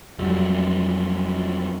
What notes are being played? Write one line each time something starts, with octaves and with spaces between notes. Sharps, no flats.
F2 F#3 G3